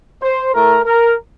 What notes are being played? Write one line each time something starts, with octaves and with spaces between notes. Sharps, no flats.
C5
A2 A3 A#4
A#4